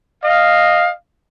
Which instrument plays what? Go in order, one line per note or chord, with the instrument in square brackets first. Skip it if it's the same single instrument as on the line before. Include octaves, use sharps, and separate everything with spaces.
[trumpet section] D#5 F5